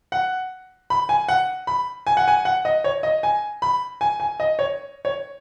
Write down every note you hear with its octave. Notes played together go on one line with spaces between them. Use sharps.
F#5
B5
G#5
F#5
B5
G#5
F#5
G#5
F#5
D#5
C#5
D#5
G#5
B5
G#5
G#5
D#5
C#5
C#5